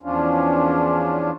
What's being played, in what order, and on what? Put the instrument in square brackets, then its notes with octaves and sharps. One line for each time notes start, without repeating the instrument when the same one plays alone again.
[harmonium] E2 F3 C#4 D4 F4